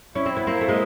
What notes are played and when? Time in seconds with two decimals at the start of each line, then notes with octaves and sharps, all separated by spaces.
0.15 C#4 E4
0.26 C4
0.37 B3
0.47 A#3 C4
0.61 A3
0.68 G#3 A#3